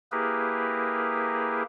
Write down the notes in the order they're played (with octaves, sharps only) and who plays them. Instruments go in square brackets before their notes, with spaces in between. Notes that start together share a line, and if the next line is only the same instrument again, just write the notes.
[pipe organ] A#3 E4 G4 G#4 A#4 B4